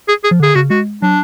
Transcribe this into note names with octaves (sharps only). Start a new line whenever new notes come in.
G#4
G#4
F3
D3 G#4
C#3 F#4
G#3 F#4
F#3 D4